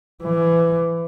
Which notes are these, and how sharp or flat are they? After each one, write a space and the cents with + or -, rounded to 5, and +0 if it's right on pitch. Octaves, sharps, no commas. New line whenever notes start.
E3 +25